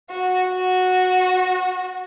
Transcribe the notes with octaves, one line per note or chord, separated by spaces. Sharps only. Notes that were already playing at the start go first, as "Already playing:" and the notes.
F#4
F#4